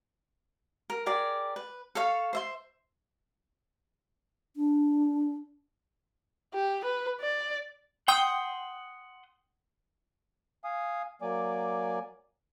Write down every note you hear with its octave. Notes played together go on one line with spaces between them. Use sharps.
A#4
G4 G#4 A#4 D5
B4
A4 C#5 F5
C5 E5 C6
D4
G4
B4
D5
F#5 G5 C6 D#6
F5 G#5 D#6
F#3 A#3 D5 G#5 D6